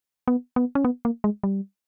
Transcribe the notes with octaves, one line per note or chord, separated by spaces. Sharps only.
B3
B3
C#4
B3
A#3
G#3
G3